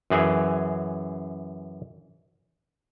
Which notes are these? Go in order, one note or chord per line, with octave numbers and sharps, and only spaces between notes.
F#2 E3 G#4 G#5